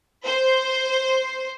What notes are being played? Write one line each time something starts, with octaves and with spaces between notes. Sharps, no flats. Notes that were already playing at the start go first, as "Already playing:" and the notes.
C5